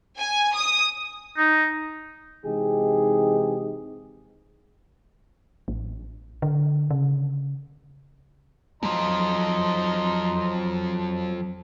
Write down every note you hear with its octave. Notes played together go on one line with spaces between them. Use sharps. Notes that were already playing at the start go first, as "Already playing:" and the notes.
G#5
D#6
D#4
C3 E3 G#3 D#4 G4 G#4
A1
D3
C#3
F2 F3 F#3 D#5 A#5 C6